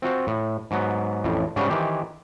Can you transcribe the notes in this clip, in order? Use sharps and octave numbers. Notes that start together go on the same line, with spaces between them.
C4 F4 F#4 C5
A2
G#2 F#3 B3
A1 F2 A2
G#2 C#3 G3 C#4 D4 F#4
D#3 E3 G4 C5